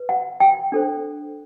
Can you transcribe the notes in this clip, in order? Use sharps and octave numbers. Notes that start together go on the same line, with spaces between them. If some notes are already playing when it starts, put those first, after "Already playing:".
Already playing: B4
F#5
G5
D4 A4 C5